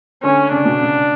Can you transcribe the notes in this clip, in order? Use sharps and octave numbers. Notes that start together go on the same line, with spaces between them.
D3 C#4
C#3 D4
B2
C#3